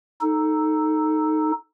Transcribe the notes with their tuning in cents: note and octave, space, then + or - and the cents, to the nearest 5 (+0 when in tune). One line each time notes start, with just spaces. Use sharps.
D#4 +0 A4 +0